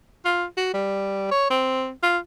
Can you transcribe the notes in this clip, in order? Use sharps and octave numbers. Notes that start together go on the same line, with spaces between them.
F4
F#4
G3
C#5
C4
F4